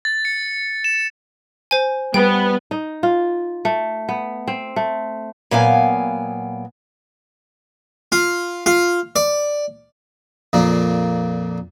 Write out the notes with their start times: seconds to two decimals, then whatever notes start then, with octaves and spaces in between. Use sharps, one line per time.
0.05 A6
0.25 C#7
0.84 E7
1.71 C5 G#5
2.14 G3 B3 G5
2.71 D#4
3.03 F4
3.65 A3
4.09 B3
4.48 C4
4.76 A3
5.51 A#2 F#3 B3 F5 G5 G#5
8.12 F4
8.66 F4
9.16 D5
10.53 F2 A#2 A#3 D4